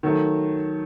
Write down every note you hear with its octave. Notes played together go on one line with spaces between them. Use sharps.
D#3 F#3 A3